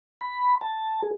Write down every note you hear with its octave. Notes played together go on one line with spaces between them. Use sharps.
B5
A5
G#4